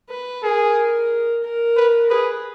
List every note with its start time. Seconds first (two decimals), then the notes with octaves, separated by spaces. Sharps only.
0.10 B4
0.42 G#4 A#4
1.43 A#4
1.76 B4
2.10 G#4 B4